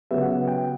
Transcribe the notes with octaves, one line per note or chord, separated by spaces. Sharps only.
C#3 F#3 B3 E5
F#5
E5
G5